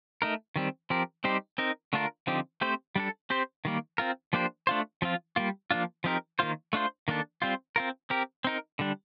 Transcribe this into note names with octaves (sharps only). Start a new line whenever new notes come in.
A3 D#4 A#4
D#3 G3 C4
F3 C4 G4 A#4
G3 C4 D#4 G4 C5
C4 D#4 A#4
D3 A3 D4 F4 A#4
D3 F3 C4 D#4 G4
A3 C4 G4 C5
G3 D4 A4
C4 G4 C5
D#3 G3 A#3
C4 F4 A#4
F3 A#3 D4 G4 C5
A3 D4 F4 C5
F3 C4 F4
G3 A#3 F4
F3 A#3 D4 F4
F3 C4 D#4 G4 A#4
D#3 A#3 F4 C5
A3 D4 F4 C5
D#3 A#3 D4 A4
G3 C4 F4 C5
C4 F4 A#4
C4 G4 A#4
C4 D#4 A#4
D3 G3 D4